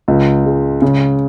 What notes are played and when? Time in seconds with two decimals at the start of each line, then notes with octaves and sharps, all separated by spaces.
0.08 C#2
0.46 G#3
0.82 C#3